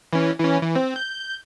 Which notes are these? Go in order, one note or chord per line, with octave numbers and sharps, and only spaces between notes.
E3 C#4
E3 C#4
E3
C4
G6